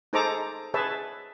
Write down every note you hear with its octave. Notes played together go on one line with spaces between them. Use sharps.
D#4 G#4 A4 C5 A#5 D6
G#4 B4 C#5 E5 A5